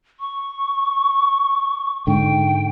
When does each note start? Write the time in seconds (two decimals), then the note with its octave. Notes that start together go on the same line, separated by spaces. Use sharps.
0.20 C#6
2.07 G#2 D3 G5